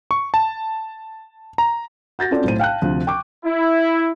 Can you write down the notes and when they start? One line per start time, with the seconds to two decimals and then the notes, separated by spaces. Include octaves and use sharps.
0.11 C#6
0.34 A5
1.58 A#5
2.19 F#4 G6 A6 A#6
2.31 C4 C#4 F4 F#4 A4 D5
2.44 B1 A2 C5 D#7
2.59 F5 G5 A5 F#6
2.82 D2 C3 F3
3.07 G5 C#6 D6
3.46 E4